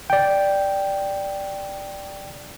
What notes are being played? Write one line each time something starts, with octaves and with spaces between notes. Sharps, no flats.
D5 G5